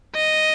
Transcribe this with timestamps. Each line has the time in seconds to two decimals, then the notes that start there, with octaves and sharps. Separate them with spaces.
0.16 D#5